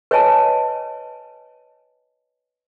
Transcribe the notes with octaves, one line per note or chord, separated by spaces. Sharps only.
B4 C#5 D#5 G#5 A5